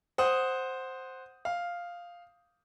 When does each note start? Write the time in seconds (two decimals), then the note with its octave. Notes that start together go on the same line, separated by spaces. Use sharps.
0.18 C5 F#5 D#6
1.45 F5